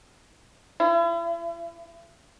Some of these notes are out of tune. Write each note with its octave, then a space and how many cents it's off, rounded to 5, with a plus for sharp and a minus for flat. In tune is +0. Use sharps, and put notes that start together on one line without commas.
E4 +40